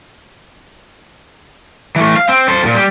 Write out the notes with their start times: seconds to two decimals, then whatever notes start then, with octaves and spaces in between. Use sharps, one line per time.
1.96 E3 A3
2.16 F5
2.29 C4
2.48 A4 C5
2.63 E2 A#2
2.74 G3